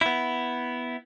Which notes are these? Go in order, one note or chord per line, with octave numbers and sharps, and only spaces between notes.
B3 E4